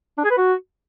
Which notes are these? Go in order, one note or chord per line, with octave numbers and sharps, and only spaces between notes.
D4
G#4
B4
F#4